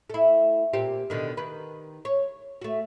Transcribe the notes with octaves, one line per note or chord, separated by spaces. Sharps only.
A3 E4
A#2 C4 G4
B2 D3 D#3
D#3 B4
C#5
A3 F#4